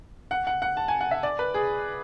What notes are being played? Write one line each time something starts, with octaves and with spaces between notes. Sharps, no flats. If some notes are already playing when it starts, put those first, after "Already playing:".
F#5
F#5
F#5
A5
G#5
F#5
E5
D5
B4
G#4